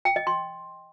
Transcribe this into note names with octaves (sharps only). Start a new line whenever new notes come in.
G5
D#5
C6